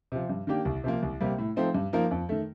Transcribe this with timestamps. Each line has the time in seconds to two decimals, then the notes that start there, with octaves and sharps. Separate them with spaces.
0.12 C3 F3
0.29 G2
0.47 D#3 A#3 D4 G4
0.65 C2
0.84 C3 F3 A#3
1.03 C2
1.20 C3 G3 A#3
1.39 A2
1.56 F3 A3 C4 D#4
1.74 G2
1.93 F3 A#3 D#4 A#4
2.11 F2
2.29 D#3 A3